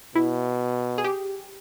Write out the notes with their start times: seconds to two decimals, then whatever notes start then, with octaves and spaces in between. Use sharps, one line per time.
0.15 B2 E4
0.98 G#4
1.04 G4